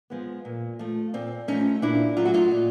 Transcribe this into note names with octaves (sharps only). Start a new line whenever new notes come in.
F3 G#3 B3
A#2
F3 A3
A#2 C4
F3 A3 C#4 D#4
A#2 D4 E4
F#3 A3 F4
F#4
D#4 F4
A#2